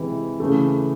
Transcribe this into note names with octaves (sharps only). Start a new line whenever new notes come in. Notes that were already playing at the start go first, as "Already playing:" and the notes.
Already playing: C3 E3 G#3 G4
C#3 E3 A3